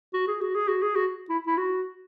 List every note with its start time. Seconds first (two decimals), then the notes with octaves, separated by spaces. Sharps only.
0.14 F#4
0.28 G#4
0.41 F#4
0.55 G#4
0.68 F#4
0.82 G#4
0.96 F#4
1.29 E4
1.46 E4
1.58 F#4